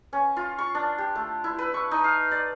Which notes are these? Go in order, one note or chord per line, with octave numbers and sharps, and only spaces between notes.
C#4
F4
C#6
D4
G4
A3
E4
B4
C#6
D#4
F5
D5